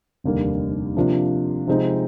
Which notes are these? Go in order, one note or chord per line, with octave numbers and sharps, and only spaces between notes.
F1 D#2 D3 G3 A#3
C3 F3 A#3 D4 F4
C3 F3 G#3 C4 D#4